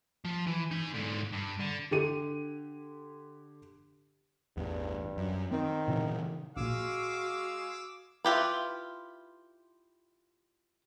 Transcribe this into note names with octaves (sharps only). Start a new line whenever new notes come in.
F3
E3
D#4 G#5
G#2 D3
G2
D3
D3 G4 D#7
A1 E2 G2
F#2
D#3 C4
A#2 C#3 E3
A#1 A#2 G#3 F#4 G#4 F5 D6 E6
E4 F4 G4 B4